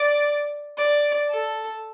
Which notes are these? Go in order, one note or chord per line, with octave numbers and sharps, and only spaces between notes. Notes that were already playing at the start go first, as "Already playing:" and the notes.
Already playing: D5
D5
A4